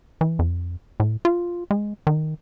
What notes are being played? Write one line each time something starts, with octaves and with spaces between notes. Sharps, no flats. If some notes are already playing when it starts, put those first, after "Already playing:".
E3
F2
A2
F4
G#3
D#3